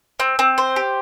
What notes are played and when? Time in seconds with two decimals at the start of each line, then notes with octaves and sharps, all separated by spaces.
0.20 C4
0.39 C4
0.58 C5
0.76 G4